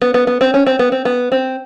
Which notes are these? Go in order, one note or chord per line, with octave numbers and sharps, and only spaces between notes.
B3
B3
B3
C4
C#4
C4
B3
C4
B3
C4